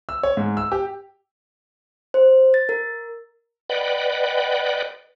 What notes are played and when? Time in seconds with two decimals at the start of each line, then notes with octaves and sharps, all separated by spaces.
0.09 E6
0.23 C#5
0.37 G#2
0.57 E6
0.72 G4
2.14 C5
2.54 A6
2.69 A#4
3.69 B4 D5 D#5 F#5 G5 B5